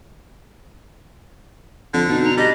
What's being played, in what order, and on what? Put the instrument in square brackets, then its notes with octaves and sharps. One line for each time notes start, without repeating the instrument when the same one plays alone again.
[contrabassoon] F2 [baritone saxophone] D3
[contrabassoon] B2 [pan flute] D#4
[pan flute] A#5
[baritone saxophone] G3 [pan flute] D#5